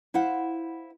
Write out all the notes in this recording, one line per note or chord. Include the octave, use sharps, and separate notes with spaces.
E4 C5 F5 F#5